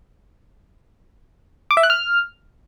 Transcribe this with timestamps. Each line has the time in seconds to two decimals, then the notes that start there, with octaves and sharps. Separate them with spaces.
1.71 D6
1.77 E5
1.83 F#6
1.90 F6